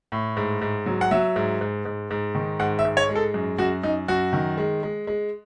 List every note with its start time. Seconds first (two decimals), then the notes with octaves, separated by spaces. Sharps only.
0.12 A2
0.37 G#2
0.61 G#2
0.86 F#3
1.01 F#5
1.11 F#3 E5
1.36 G#2
1.61 G#2
1.85 G#2
2.11 G#2
2.35 D#3
2.60 G#2 F#5
2.79 E5
2.85 G#2
2.97 C#5
3.09 G#3
3.15 A4
3.34 F#2
3.58 F#2 F#4
3.83 F#2 D#4
4.08 F#2 F#4
4.33 D#3
4.57 G#3
4.83 G#3
5.07 G#3